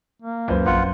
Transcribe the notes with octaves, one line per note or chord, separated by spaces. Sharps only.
A#3
C#2 F#2 B4 C5
A#1 F4 F#5